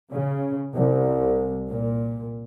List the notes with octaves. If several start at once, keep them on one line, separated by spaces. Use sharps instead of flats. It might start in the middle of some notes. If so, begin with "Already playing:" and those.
C#3
C2
A#2